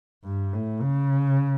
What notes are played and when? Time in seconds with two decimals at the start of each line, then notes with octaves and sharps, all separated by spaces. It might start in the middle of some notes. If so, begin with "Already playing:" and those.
0.24 G2
0.53 A2
0.82 C#3